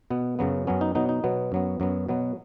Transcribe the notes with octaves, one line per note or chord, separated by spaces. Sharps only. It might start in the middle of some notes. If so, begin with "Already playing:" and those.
B2 B3
F#2 C#3 F#3 B3
F#2 F#3 B3 C#4
D#4
B2 F#3 B3 D#4
D#4
B2 F#3 B3
F#2 F#3 B3
F#2 F#3 B3
B2 F#3 B3